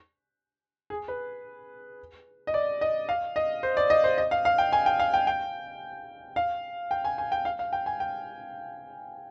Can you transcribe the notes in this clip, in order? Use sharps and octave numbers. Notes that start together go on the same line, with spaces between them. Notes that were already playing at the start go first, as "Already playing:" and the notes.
G#4
B4
D#5
D5
D#5
F5
D#5
C5
D5
D#5
C5
D#5
F5
F5
G5
G#5
G5
F5
G5
G5
F5
G5
G#5
G#5
G5
F5
F5
G5
G#5
G5